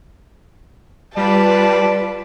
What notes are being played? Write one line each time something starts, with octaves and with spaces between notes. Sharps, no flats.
G3 F4 B4 D5 A5